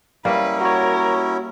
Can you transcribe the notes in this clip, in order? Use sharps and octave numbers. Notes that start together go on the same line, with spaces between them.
G3 A#3 C#4 E4 B4
F#4 A#4 C#5